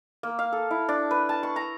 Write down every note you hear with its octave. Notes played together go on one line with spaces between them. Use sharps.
A#3
F5
A4
E4
D4
B4
A5
C#6
A#5